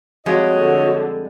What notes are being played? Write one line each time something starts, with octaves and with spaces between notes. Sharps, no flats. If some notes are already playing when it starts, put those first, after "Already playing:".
F2 G3 G#3 F#4 C#5 D#5
D3